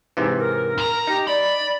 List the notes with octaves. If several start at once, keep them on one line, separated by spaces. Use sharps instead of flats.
G#2 C3 E3
A#4
A#2 A#5
D#4 G4
D5 B5